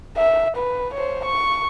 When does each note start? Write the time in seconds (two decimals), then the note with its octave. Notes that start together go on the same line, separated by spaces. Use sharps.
0.17 E5
0.57 B4
0.94 C5 C#5
1.25 C#6